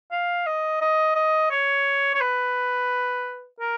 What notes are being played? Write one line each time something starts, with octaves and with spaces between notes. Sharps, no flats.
F5
D#5
D#5
D#5
C#5
C#5
B4
A#4